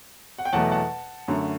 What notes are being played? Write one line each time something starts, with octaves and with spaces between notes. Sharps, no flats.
F#5
G5
E2 B2 F#3 A3 F#5 A5
F#5 A5
F#2 D3 A3